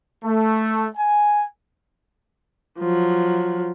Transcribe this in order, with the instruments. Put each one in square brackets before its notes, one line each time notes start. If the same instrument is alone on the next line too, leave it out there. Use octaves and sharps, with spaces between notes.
[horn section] A3
G#5
[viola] F3 F#3